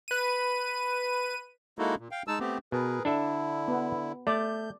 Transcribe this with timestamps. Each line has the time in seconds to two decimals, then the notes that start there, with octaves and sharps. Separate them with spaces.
0.08 B4 D#7
1.79 G#3 A#3 D#4 E4 F#4 A4
1.99 A#2
2.11 F5 G5
2.28 G#3 D#4 A5 E6
2.40 A3 B3 C4 G4
2.72 B2 G#4 A#4 B4
3.05 D3 D4 E4 A4 E5
3.68 B3
4.27 A3 D5 G6